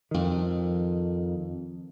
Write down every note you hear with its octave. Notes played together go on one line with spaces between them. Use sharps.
F2 D#3